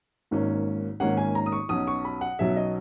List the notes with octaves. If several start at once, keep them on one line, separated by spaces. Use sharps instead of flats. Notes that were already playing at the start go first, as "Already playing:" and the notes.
G#1 G#2 D#3 A#3 C#4
G#1 G#2 D#3 A#3 C#4 F#5
G#5
A#5
D#6
C#6
B1 B2 F#3 C#4 D#6
C#6
B5
F#5
B1 B2 F#3 C#4 E5
D#5